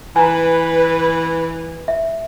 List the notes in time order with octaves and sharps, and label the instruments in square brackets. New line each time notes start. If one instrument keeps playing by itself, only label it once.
[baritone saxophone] E3 [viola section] B4 [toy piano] G#5 A#5
[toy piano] E5